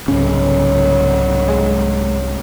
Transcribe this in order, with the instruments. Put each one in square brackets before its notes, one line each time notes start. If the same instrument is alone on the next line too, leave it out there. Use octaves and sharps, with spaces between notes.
[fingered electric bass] C2 G#2 C#4 [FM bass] C#3 [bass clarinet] F#3
[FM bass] G#3